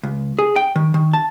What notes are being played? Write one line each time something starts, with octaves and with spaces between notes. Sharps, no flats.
C#2
G#4
G5
D#3
D#3
A5